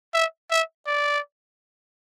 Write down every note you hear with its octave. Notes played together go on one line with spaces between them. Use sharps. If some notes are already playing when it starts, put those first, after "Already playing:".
E5
E5
D5